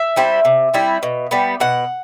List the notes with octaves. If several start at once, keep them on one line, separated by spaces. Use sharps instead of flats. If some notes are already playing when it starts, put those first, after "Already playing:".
Already playing: E5
G3 C4 E4
C3
G3 C4 E4
B2
G3 B3
B2 F#5